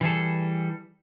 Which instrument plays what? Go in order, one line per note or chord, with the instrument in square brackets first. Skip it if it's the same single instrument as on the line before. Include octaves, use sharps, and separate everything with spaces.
[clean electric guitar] E3 G3 G#4 A4